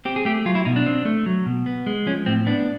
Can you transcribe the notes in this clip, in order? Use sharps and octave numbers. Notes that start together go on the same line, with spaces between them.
C4 G4
G#4
A3 G4
F#3 F4
E4
B2 D#4
D4
C4
A3
F#3
B2
B3
G#3
F3 C#4
A2 C4
B3 D4